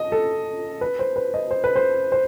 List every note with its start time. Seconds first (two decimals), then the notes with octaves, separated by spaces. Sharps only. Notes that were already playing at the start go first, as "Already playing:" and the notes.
Already playing: D#5
0.12 A4
0.81 B4
0.99 C5
1.16 B4
1.34 D#5
1.51 C5
1.64 B4
1.76 C5
2.12 C5